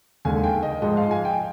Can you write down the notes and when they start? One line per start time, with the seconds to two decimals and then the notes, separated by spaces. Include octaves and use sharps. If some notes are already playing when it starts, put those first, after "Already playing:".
0.25 D#2 D3 G#3 G#5
0.44 G5
0.63 D#5
0.82 G#2 F3 G#3 D#5
0.97 F5
1.11 G#5
1.25 G5